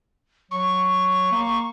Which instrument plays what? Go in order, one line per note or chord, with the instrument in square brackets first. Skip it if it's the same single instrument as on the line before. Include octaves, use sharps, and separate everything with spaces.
[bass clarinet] F#3 [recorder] C#6
[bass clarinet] A#3